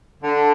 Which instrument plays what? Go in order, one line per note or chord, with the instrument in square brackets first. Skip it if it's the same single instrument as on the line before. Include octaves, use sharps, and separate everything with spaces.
[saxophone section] D3